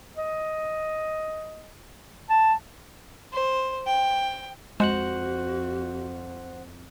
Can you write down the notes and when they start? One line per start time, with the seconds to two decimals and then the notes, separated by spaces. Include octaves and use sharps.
0.17 D#5
2.30 A5
3.33 C5
3.87 G5
4.80 F2 G#3 F#4 C5 F#5 F#6